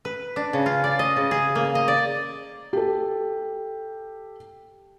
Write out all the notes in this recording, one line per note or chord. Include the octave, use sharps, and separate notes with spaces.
B4
D4
C#3
F4
D5
D#5
C#3
G#4
A#3
D#5
D5
G4 A4